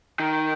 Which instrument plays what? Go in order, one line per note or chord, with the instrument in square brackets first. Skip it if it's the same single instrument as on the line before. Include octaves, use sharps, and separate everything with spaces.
[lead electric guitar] D#3